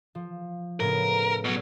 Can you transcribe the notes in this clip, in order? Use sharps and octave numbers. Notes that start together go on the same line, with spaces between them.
F3
A2 C#3 B3 A#4
B2 F#3